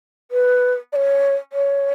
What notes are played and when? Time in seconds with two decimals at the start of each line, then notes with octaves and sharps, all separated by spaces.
0.31 B4
0.93 D5
0.96 C#5
1.53 C#5